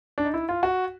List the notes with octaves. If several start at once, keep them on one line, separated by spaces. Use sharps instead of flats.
D4
D#4
E4
F4
F#4